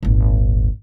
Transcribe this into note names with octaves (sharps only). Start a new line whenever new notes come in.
D#1 G#1